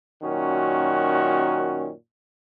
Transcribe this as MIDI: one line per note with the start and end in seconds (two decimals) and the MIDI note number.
0.23 1.91 42
0.23 1.91 46
0.23 1.91 51
0.23 1.91 61
0.23 1.91 66